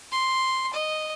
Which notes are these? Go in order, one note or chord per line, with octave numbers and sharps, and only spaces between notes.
C6
D#5